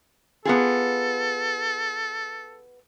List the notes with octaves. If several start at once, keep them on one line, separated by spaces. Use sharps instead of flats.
B3 F4 G#4 A4